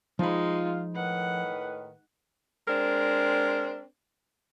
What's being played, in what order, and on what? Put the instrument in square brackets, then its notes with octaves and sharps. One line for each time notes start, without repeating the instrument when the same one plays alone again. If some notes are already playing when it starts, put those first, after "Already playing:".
[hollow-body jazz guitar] F3 B5 [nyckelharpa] G#3 D#4 [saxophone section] F4
[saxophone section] A2 D#3 B4 [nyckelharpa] F#5
[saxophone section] G#3 C4 D4 A#4